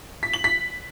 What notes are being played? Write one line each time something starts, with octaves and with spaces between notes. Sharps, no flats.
B6
F#7
B6